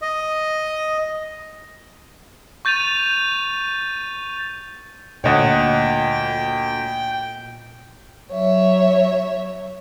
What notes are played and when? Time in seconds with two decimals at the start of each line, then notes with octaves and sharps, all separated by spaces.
0.02 D#5
2.65 C#6 G6 A6 D#7 F7
5.24 D2 A#2 C#5 D#5 F#5 G5
8.32 F#3 C#5 E5